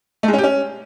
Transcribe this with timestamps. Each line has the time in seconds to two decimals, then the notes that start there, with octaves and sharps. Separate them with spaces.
0.23 A3
0.28 G#3
0.33 C#4
0.38 G4
0.43 C#4